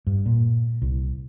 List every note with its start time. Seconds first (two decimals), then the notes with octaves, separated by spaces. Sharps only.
0.07 G2
0.26 A#2
0.82 C2